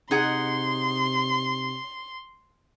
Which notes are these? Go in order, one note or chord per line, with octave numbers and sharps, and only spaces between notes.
C3 D#4 G#4 F#5 C6